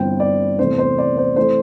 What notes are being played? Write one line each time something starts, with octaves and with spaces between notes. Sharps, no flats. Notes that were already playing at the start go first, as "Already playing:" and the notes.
Already playing: G1 G2 E3 G3 C4 G5
D5
E2 C3 A3 C4 C5
C5
D5
C5
E3 A3 C4 C5